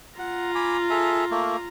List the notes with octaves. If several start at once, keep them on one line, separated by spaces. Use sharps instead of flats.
F4 F#5 A#5
G#5 B5 D6
G#4 A4 E5
A3 A#3